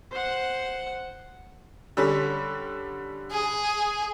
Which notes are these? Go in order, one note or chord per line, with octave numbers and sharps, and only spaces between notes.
C5 F#5
D3 G3 C#4
G#4